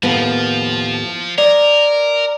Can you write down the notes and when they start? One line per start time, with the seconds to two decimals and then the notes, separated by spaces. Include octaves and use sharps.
0.03 D#2 A2 F3 B3
1.38 A#4 D5 D#5